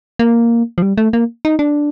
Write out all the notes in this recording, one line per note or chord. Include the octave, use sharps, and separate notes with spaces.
A#3
F3
G3
A3
A#3
D#4
D4